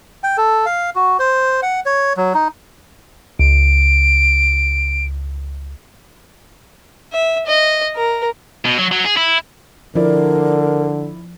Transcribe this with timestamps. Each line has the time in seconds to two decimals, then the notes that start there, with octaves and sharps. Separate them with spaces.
0.24 G5
0.38 A4
0.66 F5
0.95 F#4
1.19 C5
1.63 F#5
1.86 C#5
2.17 F#3
2.34 D#4
3.39 C#2 D7
7.13 E5
7.47 D#5
7.96 A#4
8.65 B2
8.78 F#3
8.92 F#3
9.05 G#4
9.17 E4
9.95 D3 F3 E4 A#4 D5